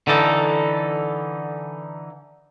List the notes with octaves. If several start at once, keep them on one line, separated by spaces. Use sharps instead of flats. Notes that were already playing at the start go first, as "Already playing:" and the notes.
D3 E3 D#4 A4